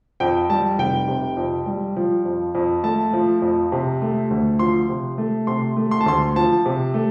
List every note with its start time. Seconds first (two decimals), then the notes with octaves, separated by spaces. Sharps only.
0.20 F2 G5
0.50 G3 A5
0.78 F1 G5
1.08 C3
1.37 F2
1.66 G3
1.96 F3
2.25 F2
2.55 F2
2.83 A3 A5
3.13 F3
3.42 F2
3.72 C3
4.02 A3
4.30 D2
4.59 F3 C6
4.89 C3
5.18 A3
5.47 C3 C6
5.77 A3
5.91 C6
6.01 A5
6.06 D2 C6
6.36 F3 A5
6.66 C3
6.94 A3